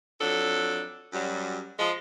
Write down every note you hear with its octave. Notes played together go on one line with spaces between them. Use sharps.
F2 F#3 D4 A4
F#2 F#3 G3
F3 G#3